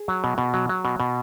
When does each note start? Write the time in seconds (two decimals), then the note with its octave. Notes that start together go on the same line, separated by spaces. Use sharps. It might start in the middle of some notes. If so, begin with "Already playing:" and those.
Already playing: G#4
0.08 F#3
0.24 B2
0.38 B2
0.54 F#3
0.69 F#3
0.85 B2
1.00 B2